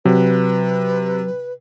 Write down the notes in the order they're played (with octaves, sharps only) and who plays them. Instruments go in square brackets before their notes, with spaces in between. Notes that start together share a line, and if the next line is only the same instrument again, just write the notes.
[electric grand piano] C3 [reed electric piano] F#3 [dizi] B4